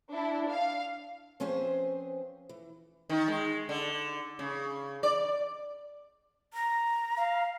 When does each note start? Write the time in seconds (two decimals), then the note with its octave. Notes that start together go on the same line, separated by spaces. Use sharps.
0.11 D4 E4
0.47 F5
1.40 F3 C4 C#4 G#4 B4 C5
2.49 E3
3.10 D#3
3.28 G#3
3.69 D3
4.39 C#3
5.03 D5
6.54 A#5
7.16 F5